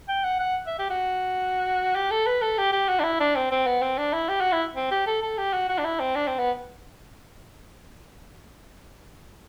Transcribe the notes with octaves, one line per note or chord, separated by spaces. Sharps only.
G5
F#5
F#5
E5
G4
F#4
G4
A4
B4
A4
G4
G4
F#4
D4
E4
D4
C4
C4
B3
C4
D4
E4
G4
F#4
E4
C4
G4
A4
A4
G4
F#4
F#4
D4
E4
C4
D4
C4
B3